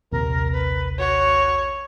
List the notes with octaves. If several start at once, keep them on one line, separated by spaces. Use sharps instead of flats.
A#1 D#2 C3 A#4
B4
F#4 C#5